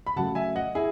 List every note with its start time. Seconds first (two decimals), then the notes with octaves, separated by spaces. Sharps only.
0.07 B5
0.16 C#3 F#3 A3 F#5 A5
0.35 E5 G#5
0.56 D#5 F#5
0.75 E4 G#4